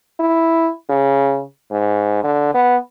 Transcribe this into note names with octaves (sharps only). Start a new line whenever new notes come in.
E4
C#3
G#2
D3
B3